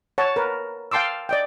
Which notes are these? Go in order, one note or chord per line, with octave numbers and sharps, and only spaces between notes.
C#5 F#5 A5
A#4 B4
F5 G5 A5 C6 D6 E6
D5 D#5 G5